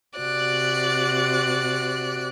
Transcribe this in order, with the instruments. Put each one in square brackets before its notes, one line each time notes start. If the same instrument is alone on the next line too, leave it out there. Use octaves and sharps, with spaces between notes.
[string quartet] C3 F#4 D5 F#6